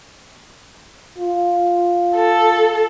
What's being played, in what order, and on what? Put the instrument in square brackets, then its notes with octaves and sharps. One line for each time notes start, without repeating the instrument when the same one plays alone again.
[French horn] F4
[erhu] A4